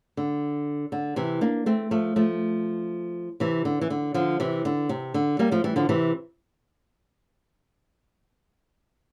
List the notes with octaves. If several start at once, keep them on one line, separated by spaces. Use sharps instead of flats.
D3
D3
C3 E3
A#3 D4
A3 C4
F3 A3
F3 A3
C3 E3
D3
E3
D3
D3 F3
C3 E3
D3
C3
D3
G3 A#3
F3 A3
E3 G3
D3 F3
C3 E3